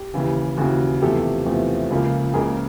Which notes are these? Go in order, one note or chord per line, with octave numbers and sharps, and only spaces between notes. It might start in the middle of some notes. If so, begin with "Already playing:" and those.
Already playing: G4
D#2 C#3 E3
D#2 C#3 E3 F#4 G#4
E2 C3 F3 A3 G4 A4
E2 C3 F3 A3
C#2 C#3 F3 A#3
C#2 C#3 F3 A#3 G#4 A#4